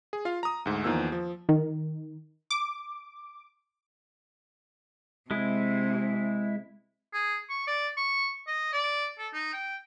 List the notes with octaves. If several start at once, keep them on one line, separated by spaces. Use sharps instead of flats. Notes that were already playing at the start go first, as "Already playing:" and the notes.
G#4
F4 F5
A#5 D#6
D2 G#2
E2 D#3 F3 A#3 E6
F3
D#3
D6
C3 G#3 E4
G#4
C#6
D5
C#6
D#5
D5
A4
D#4
G5